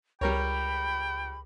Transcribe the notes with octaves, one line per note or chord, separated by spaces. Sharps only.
C#2 G3 A#4 C#5 G5 B5